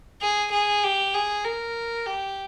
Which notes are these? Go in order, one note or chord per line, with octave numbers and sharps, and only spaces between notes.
G#4
G#4
G4
G#4
A#4
G4